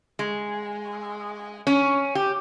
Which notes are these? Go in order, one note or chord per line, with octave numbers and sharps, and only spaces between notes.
G#3
C#4
G4